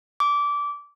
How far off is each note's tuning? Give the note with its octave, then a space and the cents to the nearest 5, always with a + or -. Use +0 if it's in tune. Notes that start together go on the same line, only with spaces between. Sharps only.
D6 -20